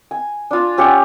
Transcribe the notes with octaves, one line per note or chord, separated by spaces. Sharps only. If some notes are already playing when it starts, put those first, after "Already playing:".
G#5
D4 F4
C#4 G4 E5 F#5